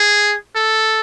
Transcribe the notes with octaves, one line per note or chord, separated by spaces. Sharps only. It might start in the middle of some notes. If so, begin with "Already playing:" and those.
Already playing: G#4
A4